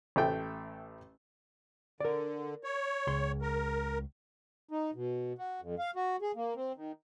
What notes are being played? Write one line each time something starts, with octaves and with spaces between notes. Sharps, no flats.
A1 A3 G5
D3 A#4 D5
C#5
C#2 C6
A#4
D#4
B2
F#4
F2
F5
F#4
G#4
A#3
C4
D#3